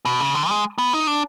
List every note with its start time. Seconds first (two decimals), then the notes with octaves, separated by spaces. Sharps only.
0.05 B2
0.20 C#3
0.35 D3
0.49 G#3
0.78 B3
0.93 D#4
1.07 D4